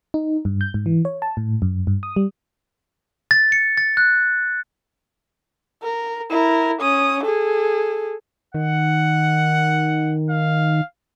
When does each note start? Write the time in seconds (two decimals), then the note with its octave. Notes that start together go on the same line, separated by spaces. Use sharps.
0.14 D#4
0.45 G2
0.61 G6
0.74 G#2
0.86 E3
1.05 C#5
1.22 A5
1.37 A2
1.62 F#2
1.87 G2
2.03 D#6
2.16 G3
3.31 A6
3.52 C#7
3.78 A6
3.97 F#6
5.83 A#4
6.30 E4 A#4
6.81 C#4 D#6
7.24 G#4 A4
8.54 D#3 F#5
10.30 F5